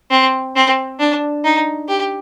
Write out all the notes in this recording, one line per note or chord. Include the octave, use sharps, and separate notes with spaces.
C4
C4
D4
D#4
G4